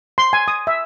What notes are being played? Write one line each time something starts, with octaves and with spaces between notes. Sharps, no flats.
C6
G#5
D#6
E5